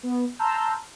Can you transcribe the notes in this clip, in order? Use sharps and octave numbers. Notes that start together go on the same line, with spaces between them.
B3
A5 A#5 C6 E6 F6 G6